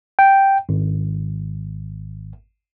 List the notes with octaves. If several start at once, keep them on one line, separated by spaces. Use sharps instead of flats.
G5
G#1